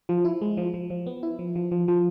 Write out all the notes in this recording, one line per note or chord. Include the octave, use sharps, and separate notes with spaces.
F3
E4
G#3
F3
F3
F3
B3
E4
F3
F3
F3
F3